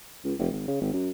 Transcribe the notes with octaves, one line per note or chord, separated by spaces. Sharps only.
C#2
F1
G#1
C#3
G#1
F#2